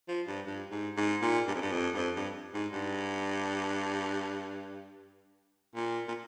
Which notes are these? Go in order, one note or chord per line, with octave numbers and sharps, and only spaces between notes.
F3
G2
G2
G#2
G#2
A#2
G2
F2
G2
F2
G2
F2
G2
G#2
G2
A#2
A#2